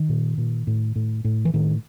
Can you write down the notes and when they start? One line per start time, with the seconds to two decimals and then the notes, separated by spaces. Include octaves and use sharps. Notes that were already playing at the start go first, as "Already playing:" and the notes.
Already playing: D#3
0.09 A#2
0.38 A#2
0.67 A2
0.96 A2
1.25 A2
1.45 E3
1.54 A2 D#3